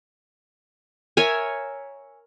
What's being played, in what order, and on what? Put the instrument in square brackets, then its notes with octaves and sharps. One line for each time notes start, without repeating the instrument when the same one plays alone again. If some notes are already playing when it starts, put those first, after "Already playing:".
[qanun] A#4 C#5 E5 G#5